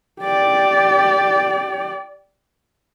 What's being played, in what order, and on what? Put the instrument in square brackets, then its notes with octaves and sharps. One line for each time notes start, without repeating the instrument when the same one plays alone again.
[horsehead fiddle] G4 D5